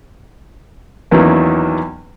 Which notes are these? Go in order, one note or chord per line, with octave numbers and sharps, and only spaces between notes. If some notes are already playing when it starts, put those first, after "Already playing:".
E2 D#3 E3 F#3 A#3 C#4